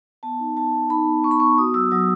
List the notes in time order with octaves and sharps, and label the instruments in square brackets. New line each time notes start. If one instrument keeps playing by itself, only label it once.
[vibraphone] B3 A5
D#4
B3 A5
B3
D#4 B5
B3
B3 C#6
B5
B3 C#6
F#4 D#6
F#3 E6
F#3 D#6